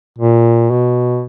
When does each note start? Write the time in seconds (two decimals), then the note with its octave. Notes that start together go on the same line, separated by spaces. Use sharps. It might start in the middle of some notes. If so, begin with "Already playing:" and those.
0.19 A#2
0.71 B2